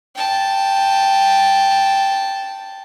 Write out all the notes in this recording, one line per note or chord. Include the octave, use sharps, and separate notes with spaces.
G5 A5